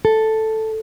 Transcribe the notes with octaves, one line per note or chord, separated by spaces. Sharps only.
A4